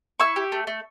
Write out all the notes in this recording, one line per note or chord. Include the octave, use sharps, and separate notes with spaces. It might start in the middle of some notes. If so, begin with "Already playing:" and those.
E4 C#6 E6
G4
A3
A3